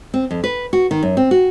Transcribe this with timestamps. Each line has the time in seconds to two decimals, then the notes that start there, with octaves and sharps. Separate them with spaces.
0.14 C4
0.31 F2
0.44 B4
0.73 F#4
0.91 D#3
1.03 F#2
1.17 C4
1.31 F#4